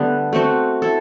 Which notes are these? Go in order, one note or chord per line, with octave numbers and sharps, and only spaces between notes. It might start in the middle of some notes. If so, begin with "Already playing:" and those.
Already playing: D3 G3 A3 B3
A3 C4 F#4
E4 A4